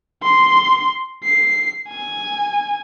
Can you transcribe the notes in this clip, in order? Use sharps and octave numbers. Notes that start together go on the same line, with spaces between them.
C6
C7
G#5